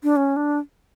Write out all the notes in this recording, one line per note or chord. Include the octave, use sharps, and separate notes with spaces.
D4
C#4
D4